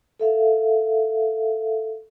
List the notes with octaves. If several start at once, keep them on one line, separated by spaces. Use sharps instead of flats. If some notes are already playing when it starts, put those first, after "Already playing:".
A4 E5 F5